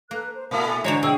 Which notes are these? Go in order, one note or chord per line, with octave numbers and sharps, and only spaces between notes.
A#3 A4 B4 F#6
C5
A#2 A3 E4 A#4 F5 A5
A4 G#5
D3 E3 G#3 F4 F#4 C5 C#5 A#5
B2 G#4 G5 E6